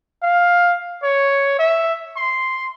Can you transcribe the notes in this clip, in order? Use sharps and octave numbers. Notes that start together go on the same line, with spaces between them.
F5
C#5
E5
C6